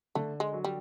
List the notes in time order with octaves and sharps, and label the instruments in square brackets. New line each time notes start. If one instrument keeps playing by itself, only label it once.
[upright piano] D3 [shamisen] A3
[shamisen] G#3
[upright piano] F#3
[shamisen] G3